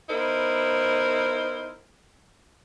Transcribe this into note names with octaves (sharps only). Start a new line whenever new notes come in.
B3 D#4 E4 A#4 C5